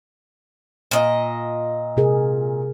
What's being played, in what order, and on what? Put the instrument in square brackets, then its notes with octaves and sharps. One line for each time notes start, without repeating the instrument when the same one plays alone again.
[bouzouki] A#2 D#5
[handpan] C3 G#4 A#4